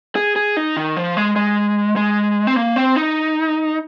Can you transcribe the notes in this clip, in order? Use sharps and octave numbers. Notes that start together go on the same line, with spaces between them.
G#4
G#4
D#4
D#3
F3
G#3
G#3
G#3
C4
A#3
C4
D#4